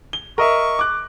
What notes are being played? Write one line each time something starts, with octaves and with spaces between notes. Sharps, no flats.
G7
A#4 D#5 E5 C#6
D6 F#6